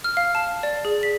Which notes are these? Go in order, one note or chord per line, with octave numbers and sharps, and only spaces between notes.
F6
F5
A5
D5
G#4
B6